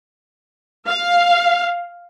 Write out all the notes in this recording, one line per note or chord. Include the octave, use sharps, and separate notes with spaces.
F5